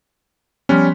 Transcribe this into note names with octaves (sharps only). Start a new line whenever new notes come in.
F3 G3 B3 C#4